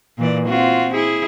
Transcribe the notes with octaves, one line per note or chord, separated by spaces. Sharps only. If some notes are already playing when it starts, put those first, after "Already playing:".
A#2 E3 D5
C4 F4 F#4
E4 G#4